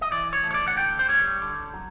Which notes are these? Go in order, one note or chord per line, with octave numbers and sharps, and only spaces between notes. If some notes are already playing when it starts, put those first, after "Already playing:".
D#5
E3 D5
C#5
A3
C#5
D5
F#5
D3 G5
C5
G3 C#5
D3
F#3